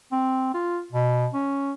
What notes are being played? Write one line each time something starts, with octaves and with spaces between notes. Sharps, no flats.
C4
F4
B2
C#4